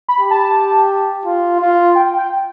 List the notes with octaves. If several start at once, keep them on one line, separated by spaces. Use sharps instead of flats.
B5
G4
A5
F4
F4
G5
G5